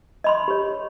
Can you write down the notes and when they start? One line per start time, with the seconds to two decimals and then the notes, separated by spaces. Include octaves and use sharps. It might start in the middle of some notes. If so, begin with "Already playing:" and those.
0.24 D#5 B5 C6
0.48 G4 C#5